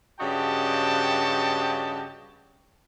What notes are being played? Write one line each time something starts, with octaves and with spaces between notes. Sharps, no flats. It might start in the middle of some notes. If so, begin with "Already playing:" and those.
G2 C#3 F#4 D#5 G5 A5